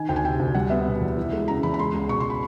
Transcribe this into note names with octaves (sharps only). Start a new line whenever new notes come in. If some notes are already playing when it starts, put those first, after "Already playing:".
Already playing: D#3 G#5
D2 G5
G#5
C3 G5
D2
G3 F#5
B3 E5
B2
E2
E3
G#3
C#3 A#5
E2 B5
B5
G#3 C6
C#2
B2 C#6
C6
B5